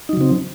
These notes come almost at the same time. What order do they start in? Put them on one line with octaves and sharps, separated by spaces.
D#4 F#3 C#3 C4